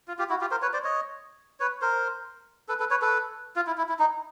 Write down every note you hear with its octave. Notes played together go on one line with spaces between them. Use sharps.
F4
F4 G4
E4 F#4
F4 G4
A#4 C5
B4 C#5
C5 D5
C#5 D#5
B4 C#5
A#4 C5
A4 B4
A4 B4
B4 C#5
A4 B4
F4
E4
E4
E4
D#4